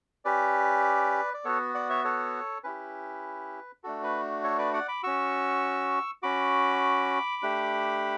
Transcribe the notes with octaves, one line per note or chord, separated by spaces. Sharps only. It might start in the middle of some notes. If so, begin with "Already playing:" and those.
C#4 G4 B4 D5
D5
B3 F#4 A4 C#5
D5 F#5
C#5 E5
A4 C#5
C#4 E4 G4 B4
A3 D4 F#4 A4
B4
A4 C#5
B4 D5
D5 F#5
B5 D6
C#4 F#4 C#6 E6
C#4 F#4 B5 D6
A3 D4 G4